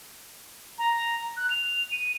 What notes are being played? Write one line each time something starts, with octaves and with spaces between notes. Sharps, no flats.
A#5
F#6
F7
D#7